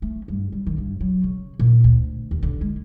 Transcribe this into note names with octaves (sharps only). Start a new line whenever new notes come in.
A3
G2
G3
D#3
G2
F#3
C#3
A#2
D2
D#2
D3
G#3